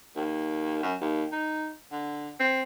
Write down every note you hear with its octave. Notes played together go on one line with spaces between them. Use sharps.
D#2
F#2
D#2
D#4
D3
C4